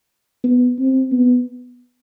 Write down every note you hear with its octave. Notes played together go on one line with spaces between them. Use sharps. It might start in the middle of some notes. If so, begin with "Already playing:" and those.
B3
C4
B3